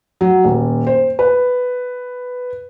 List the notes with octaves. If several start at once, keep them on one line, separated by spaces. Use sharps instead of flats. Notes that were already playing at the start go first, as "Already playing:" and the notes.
F#3
D#1
C5
B4